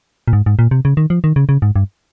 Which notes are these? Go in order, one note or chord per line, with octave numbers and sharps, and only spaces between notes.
A#2
G#2
G#2
A#2
C3
C#3
D#3
F3
D#3
C#3
C#3
G#2
G2